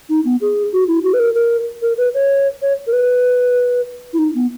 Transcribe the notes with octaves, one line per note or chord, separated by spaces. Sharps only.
D#4
B3
G#4
F#4
E4
F#4
B4
A#4
A#4
A#4
B4
C#5
C#5
A#4
B4
E4
D#4
B3